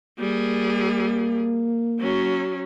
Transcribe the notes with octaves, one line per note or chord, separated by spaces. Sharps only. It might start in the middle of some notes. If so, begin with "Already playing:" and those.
G3 A#3 G#4
F#3 C#4